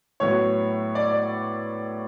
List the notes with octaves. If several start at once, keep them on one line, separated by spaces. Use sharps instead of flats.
A2 F#3 B3 C#5
D5
D5